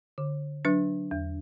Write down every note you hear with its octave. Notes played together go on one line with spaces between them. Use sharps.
D3
F#3 D4 B4
E2